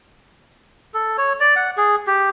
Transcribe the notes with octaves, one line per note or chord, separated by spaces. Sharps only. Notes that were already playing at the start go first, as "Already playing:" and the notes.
A4
C#5
D5
F#5
G#4
G4